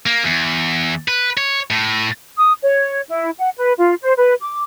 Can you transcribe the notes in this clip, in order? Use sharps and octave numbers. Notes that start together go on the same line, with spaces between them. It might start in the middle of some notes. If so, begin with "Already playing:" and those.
A#3
E2
B4
C#5
A2
D#6
C#5
E4
F#5
B4
F4
C5
B4
D6